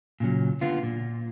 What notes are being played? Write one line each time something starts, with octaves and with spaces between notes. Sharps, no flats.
A#2 C#3 F#3
D3 B3 F4
A#2